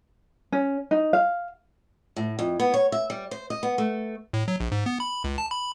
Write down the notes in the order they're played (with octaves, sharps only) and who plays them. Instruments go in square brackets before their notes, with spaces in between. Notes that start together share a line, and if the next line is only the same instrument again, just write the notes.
[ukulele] C#4
D#4
F5
[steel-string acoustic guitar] A2
F2
B3
C#5
E5
G3
C5
D#5
B3
A3
[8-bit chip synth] A2
F#3
A#1
G#2
B3
B5
C#2
A5
B5